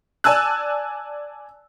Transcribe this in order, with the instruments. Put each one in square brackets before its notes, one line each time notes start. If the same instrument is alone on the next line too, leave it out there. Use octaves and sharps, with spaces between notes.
[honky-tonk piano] D5 G#5 A5 E6 F#6